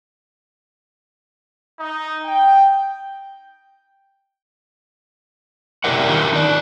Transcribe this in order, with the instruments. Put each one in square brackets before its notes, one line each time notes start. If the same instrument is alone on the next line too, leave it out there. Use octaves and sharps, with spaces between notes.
[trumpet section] D#4
G5
[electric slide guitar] C3 E4 G4 A#4 D5 F#5
D#3 D4 D#4 F4 A#4
D#4 D5